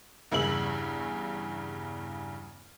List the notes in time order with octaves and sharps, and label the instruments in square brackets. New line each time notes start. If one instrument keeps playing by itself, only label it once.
[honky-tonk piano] E2 G2 C#3 E6 F#7